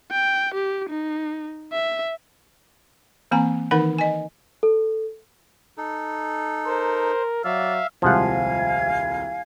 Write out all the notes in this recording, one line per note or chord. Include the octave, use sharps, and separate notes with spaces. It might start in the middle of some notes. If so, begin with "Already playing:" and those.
G5
G4
D#4
E5
E3 A#3 C4 G#5 A#5
D#3 E3 D#4 A#4 F#5 B5
D#5 G#5
A4
D#4 A4
A#4 C5
F#3 D5 E5 F5
D#1 C2 F3 G#3 F5 F#5 G#5 G#6